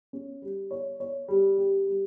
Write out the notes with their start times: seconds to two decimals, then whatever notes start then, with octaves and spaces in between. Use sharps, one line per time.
0.13 C#4
0.42 G3
0.71 C#5
1.00 C#5
1.28 G3
1.58 G4
1.86 G3